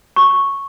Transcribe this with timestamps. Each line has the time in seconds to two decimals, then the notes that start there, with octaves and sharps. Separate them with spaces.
0.16 C#6